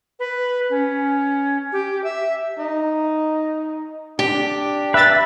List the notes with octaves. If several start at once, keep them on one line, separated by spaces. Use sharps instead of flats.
B4
C#4
G4
E5
D#4
D4 G4
B4 E5 A6